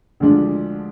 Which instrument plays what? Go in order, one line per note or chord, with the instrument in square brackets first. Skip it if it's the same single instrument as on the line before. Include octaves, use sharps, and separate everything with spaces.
[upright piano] D2 D3 F3 G#3 D4